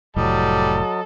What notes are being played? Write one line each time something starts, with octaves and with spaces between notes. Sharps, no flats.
F1 A2 F#3 G3 A4 D#5